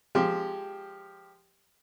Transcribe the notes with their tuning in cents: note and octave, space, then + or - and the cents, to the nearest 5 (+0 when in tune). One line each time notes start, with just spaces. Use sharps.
F3 +0 G#3 +0 G4 +0